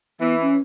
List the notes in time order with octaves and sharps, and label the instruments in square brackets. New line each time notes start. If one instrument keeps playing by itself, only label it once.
[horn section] E3 [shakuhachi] B3
[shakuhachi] C#4